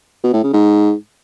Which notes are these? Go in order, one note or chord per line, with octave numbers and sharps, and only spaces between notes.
B2
A2
C#3
G#2